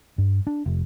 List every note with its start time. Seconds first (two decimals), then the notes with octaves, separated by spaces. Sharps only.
0.18 G2
0.47 D4
0.66 F1